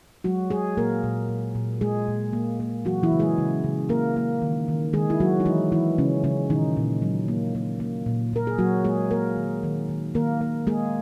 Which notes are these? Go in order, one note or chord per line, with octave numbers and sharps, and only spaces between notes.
F#3 G#3 F#4
G#3 G#4
A#2 A#3 A#4
A#2
A#2
A#2
G#3 G#4
A#2
A#3
A#3
E3 F#3 F#4
E3 E4
C#3
G#3 G#4
C#3
C#3
A#3 A#4
A#3
D#3
D#3
D#3 G#3 G#4
E4
F#3 G#3 F#4
D#4
E3 G#3 E4
E3 G#3 E4
C#3 G#3 C#4
C#3 G#3 C#4
A#2 D#3 D#4
A#2
F#3
A#3
A#3
A#3
A#2
A#2 A#4
G#4
F#3 A#3 F#4
G#3 A#3 G#4
A#3 A#4
D#3
D#3
D#3
D#3 A#3 A#4
A#3
G#3 A#3 G#4